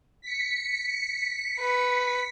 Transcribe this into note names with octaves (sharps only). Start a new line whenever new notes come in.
B6 C#7
B4